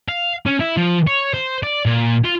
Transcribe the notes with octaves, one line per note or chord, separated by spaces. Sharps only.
F5
C#4
E4
F3
C#5
C5
D5
A#2
F4